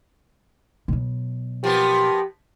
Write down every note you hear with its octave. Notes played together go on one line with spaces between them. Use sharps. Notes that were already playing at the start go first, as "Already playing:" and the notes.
B2 F#3
F3 A#3 B3 G4